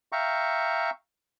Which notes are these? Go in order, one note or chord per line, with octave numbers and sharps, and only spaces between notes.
E5 F5 G5 A#5 C#6